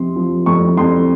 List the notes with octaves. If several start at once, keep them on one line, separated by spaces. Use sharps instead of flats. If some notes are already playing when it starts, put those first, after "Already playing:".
Already playing: F2 C3 C6
F3
F2 C#6
F2 C6